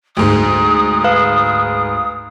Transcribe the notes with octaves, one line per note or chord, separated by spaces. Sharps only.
D2 G#2 D#6
B4 F5